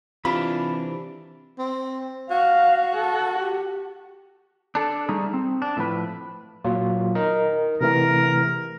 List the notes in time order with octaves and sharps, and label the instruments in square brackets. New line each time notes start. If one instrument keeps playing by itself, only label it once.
[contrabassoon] C3 [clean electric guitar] E3 D4 [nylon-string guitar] F4 [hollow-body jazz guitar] B5
[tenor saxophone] C4
[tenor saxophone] F#4 [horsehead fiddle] F5
[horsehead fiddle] A4
G4
[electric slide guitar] D4 A4
G3 A3 D#4 G#4
C4
D4
A2 F3 B4
[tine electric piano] A#2 F#3 F4
D#4 A#4 D#5
[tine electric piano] C3 E3 A3 [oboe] A#4